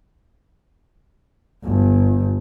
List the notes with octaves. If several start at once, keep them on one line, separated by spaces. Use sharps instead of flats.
G1